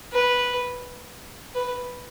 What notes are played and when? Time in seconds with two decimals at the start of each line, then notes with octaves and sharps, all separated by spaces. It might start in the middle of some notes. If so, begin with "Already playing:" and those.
0.13 B4
1.55 B4